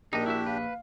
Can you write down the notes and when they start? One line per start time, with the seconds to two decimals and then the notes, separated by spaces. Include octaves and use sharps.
0.13 A#1 D4 D#4 G4 A#4 D#5
0.26 E4 F#4 E5
0.46 B4 F5